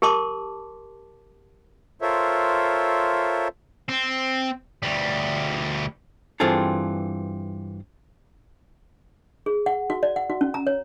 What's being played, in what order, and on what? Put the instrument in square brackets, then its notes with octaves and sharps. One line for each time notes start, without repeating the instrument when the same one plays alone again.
[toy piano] G4 A#4 A5 C6 D6
[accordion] F4 A4 A#4 C5 C#5 E5
[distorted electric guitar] C4
D2 G3
[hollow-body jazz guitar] G2 E3 C4 F4 G#4 A4
[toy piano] G#4
F#5
F#4
D5
F#5
F#4
C#4
A#5
C#5